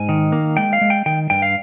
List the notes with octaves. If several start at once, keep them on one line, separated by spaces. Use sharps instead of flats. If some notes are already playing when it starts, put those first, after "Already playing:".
Already playing: G#2 G#5
D#3
A#3
G#3 G5
F5
G#3
G5
D#3 G5
G2 G5
F5